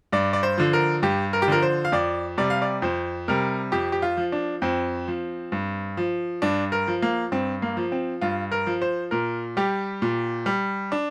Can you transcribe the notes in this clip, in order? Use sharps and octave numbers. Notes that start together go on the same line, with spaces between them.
G2 D5
D5
C5
D3 F3
A#4
G2 G4
A#4
G4
D3 F3 A#4
C5
F5
F2 D5
C3 G3 D5
F5
D5
F2 C5
C3 G3 A#4
F2 G4
G4
F4
F3
D4
F2 C4
F3
G2
F3
G2 D4
A#4
F3
A#3
G2 C4
A#3
F3
C4
G2 F4
A#4
F3
C5
A#2 A#4
G3 G4
A#2
G3
D4